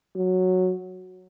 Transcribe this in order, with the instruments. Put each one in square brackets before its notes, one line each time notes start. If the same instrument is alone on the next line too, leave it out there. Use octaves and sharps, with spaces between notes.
[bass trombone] F#3